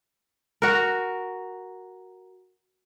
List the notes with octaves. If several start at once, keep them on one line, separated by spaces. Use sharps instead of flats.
F#4 A#4